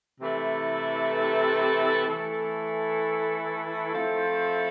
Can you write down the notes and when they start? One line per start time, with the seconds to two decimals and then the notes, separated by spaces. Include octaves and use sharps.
0.20 C3 E3 A3 E4 A4
2.06 E3 A3 E4 A4
3.93 F3 A3 C4 E4 A4